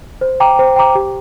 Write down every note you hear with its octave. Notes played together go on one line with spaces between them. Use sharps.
C5
G5 A#5 D6
C5
G5 A#5 D6
G4